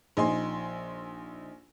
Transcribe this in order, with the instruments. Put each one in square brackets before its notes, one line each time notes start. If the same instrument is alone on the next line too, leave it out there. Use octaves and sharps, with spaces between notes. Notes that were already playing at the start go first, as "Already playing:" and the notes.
[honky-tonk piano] A#1 D#4 G#5 C6